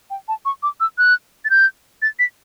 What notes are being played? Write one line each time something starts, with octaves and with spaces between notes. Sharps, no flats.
G5
A5
C#6
D6
E6
F#6
A6
G6
A6
B6